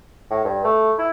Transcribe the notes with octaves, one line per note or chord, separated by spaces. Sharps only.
A2
G2
A3
E4